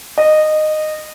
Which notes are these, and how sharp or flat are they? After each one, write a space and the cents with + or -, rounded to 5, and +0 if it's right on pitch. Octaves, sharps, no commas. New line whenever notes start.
D#5 -15